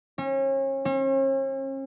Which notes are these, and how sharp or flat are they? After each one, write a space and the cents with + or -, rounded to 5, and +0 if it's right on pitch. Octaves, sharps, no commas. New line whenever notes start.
C#4 -35
C#4 -45